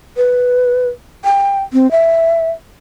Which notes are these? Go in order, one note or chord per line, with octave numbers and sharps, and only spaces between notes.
B4
G5
C4
E5